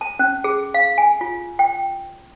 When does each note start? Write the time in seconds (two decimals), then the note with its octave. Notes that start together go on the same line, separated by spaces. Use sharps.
0.01 A5
0.19 C#4
0.44 G#4
0.74 F5
0.98 G#5
1.21 F4
1.59 G5